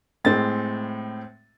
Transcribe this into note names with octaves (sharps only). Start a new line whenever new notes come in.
A2 G#3 C4 A6